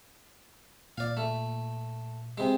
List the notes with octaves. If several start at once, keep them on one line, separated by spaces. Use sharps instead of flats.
A#2 D5 F5
A3
C3 G#3